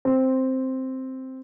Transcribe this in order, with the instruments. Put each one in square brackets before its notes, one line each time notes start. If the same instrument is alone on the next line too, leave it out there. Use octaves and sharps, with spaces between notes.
[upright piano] C4